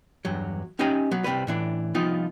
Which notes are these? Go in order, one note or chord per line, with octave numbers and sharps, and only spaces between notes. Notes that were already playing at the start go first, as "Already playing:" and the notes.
E2 G2 F#3
C#4 D#4 G4 D#5 G#5 A#5
F#3 B3
C2 C3 E3 G3 B4
A2 E3 D4
C2 F3 B3 D#4 F4 G5